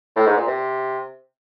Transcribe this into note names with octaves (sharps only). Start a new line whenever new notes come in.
A2
G#2
A#2
C3